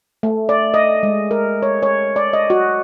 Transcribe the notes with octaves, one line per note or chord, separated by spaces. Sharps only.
A3
D5
D#5
G#3
A#4
C#5
C#5
D5
D#5
F#4